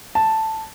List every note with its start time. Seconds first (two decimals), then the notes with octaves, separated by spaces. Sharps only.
0.15 A5